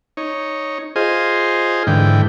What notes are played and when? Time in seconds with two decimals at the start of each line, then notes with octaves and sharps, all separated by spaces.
0.17 D#4 C#5
0.96 F4 G#4 C5 D#5
1.87 G#2 D3 E3 G5